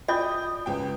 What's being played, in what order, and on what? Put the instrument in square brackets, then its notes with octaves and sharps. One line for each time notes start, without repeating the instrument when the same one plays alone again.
[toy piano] F4 D#5 [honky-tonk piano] D5 G5 G6 [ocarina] D#6
[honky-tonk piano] C#2 G5 [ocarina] B4